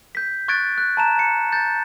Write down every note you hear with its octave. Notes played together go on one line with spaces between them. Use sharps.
G6 B6
C#6 F#6 G#6 A6 D7
F#6
A5 A#5 E7
C#7
G6 A6